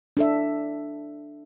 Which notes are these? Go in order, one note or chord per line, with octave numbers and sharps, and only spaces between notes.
D4 A4 E5